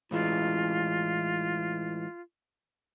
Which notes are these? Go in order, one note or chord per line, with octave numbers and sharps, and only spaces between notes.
A2 E3 G#3 F4